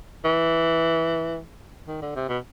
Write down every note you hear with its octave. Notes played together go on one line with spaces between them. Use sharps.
E3
D#3
D3
C3
B2